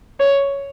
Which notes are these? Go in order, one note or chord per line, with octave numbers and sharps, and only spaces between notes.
C#5